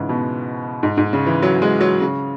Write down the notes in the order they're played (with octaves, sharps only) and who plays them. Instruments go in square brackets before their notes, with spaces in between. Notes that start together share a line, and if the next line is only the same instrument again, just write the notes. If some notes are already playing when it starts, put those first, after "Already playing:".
Already playing: [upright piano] G#2 C#3 E3
B2
G#2
G#2
C#3
E3
F#3
G#3
F#3
C#3